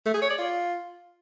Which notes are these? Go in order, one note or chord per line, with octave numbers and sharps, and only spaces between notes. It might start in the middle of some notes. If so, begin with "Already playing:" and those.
A3
G#4
C#5
D5
F4